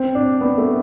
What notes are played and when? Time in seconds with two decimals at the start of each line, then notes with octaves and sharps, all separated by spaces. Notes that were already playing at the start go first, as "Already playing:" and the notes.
Already playing: C4
0.15 D4
0.41 B3
0.58 A3